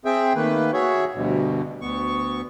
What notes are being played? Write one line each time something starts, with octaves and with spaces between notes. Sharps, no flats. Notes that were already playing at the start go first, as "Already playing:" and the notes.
C4 G#4 E5 G5
D#3 A3 A#3 B4
F#4 G#4 C#5 E5
D2 G2 B2
D2 B3 C#6